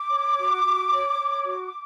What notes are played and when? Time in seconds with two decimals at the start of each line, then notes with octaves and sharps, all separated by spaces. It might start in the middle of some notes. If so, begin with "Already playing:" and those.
Already playing: D6
0.10 C#5
0.37 F#4
0.64 F#4
0.91 C#5
1.18 C#5
1.45 F#4